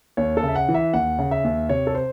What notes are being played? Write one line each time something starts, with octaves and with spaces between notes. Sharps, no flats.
D#2 C#5
A4
C#3
E5
F#5
E3
E5
D#2 F#5
C#3
E5
D#2
C3 C#5
A4
C5